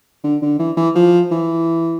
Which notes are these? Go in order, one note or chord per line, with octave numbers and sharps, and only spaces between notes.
D3
D3
E3
E3
F3
E3